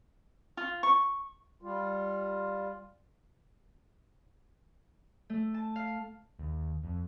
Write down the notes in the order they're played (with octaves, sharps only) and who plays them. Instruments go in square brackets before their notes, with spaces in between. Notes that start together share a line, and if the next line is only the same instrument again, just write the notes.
[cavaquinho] F4
C#6
[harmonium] G3 F4
[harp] A3
A5
F5
[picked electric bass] D#2
F2